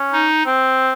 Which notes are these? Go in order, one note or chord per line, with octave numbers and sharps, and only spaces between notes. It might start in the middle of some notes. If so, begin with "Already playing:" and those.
Already playing: C#4
D#4
C4